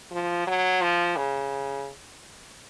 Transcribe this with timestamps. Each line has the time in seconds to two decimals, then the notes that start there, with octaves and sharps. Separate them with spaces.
0.12 F3
0.47 F#3
0.82 F3
1.17 C#3